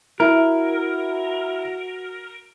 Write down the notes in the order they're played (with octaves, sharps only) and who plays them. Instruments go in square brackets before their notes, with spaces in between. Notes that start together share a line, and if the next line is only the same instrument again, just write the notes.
[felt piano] E4 [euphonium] F#4 [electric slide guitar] A#4